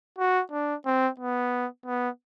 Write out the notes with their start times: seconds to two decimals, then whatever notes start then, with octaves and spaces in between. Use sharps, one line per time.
0.18 F#4
0.52 D4
0.86 C4
1.20 B3
1.86 B3